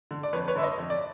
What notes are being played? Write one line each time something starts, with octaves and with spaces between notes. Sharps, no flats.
D3
D5
F2 B4 C#5
B4 C#5
D3 E5
C#5 D#5
F2
D5